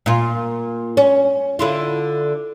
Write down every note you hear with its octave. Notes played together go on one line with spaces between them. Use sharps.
A#2 F4
C#4
D3 E4 F4